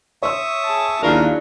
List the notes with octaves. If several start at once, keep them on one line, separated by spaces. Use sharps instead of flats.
C#5 E5 C6 C#6 D#6 E6
G#4 A5
D#2 F#3 D4 E4 F4 G#4 A#4